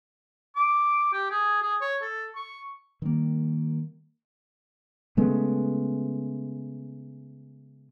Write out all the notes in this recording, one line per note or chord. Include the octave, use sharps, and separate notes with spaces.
D6
G4
G#4
G#4
C#5
A4
C#6
D#3 G3 A#3
C#3 G#3 A3 B3